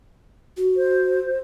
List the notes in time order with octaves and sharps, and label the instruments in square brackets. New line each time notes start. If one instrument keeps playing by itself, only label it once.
[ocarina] F#4
[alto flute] C5